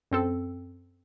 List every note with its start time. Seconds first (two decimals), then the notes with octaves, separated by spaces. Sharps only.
0.11 F#2 C4 A4